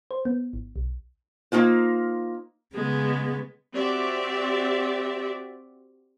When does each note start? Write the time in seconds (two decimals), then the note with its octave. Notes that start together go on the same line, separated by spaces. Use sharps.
0.11 C5
0.25 B3
0.53 G#1
0.76 B1
1.52 A#3 C4 D#4 F4 C5
2.75 C#3 G#3 B3
3.73 C4 F#4 G4 D5 E5